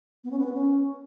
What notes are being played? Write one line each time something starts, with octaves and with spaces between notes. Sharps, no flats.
B3
C#4
B3
B4
C#4